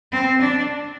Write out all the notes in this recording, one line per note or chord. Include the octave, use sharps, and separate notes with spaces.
C4
D4